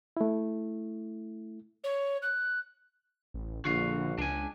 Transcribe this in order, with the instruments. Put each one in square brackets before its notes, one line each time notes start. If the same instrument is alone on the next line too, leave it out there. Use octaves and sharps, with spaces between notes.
[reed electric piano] A3 E4
[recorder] C#5
F#6
[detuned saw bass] A1
[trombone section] A#1 F4 [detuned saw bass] D3 [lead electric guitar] F#4 F5
[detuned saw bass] C#2 [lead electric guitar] D4 G#5